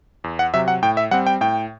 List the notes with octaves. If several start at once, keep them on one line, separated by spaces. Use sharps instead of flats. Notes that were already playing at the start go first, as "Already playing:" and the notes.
E2
F#5
C3 F#3 E5
F#5
A2 G5
E5
G3 C4 F#5
G5
A2 G5